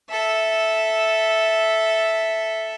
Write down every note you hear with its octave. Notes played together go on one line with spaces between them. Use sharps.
A4 E5